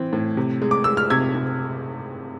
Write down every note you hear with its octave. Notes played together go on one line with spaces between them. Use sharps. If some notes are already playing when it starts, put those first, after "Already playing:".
Already playing: E3 C4
A2
C3
G#3
D6
G#3 E6
F6
C3 E6 G#6
C3